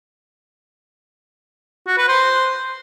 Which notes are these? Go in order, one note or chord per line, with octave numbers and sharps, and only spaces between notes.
F#4
B4
C5